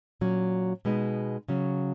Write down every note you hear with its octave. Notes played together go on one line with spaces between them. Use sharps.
A#2 F#3 C#4
B2 G#3 B3 D#4
C#3 F#3 C#4